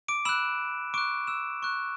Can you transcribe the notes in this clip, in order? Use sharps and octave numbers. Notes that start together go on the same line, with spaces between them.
D6 D7
B5 E6 F#6 E7
C#6 D6 F#6 D7
E6 E7
C#6 F#6